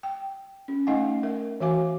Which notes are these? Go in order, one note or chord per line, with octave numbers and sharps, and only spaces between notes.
G5
C#4
A3 D#4 D#5 F5 F#5 G#5
A#4 E5
E3 F#4 E5 F5 G#5 D6